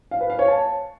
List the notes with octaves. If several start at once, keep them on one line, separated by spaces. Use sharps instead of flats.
F5
B4
F5
C#5
A5